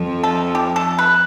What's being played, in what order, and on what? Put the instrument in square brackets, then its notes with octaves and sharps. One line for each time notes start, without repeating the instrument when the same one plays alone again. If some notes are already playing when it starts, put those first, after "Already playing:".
Already playing: [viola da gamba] F2 F3
[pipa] A4
G4
A4
B4